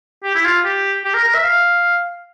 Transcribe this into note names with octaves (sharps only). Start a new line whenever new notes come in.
G4
E4
F4
G4
G4
A#4
A#4
E5
F5